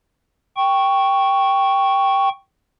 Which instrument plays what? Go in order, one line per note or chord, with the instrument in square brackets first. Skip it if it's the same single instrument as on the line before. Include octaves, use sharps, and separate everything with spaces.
[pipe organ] G5 C#6